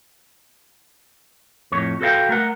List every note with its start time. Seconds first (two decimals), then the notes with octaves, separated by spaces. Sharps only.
1.72 F2 A2 C#5
2.01 F#4 A4 B4 D5 F5 G5
2.29 A3 A#4 F#5